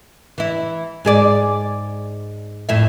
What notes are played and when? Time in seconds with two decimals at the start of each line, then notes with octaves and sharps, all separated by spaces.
0.38 E3 E4
1.05 G#2 G#4 D5
2.69 F2 A2 E5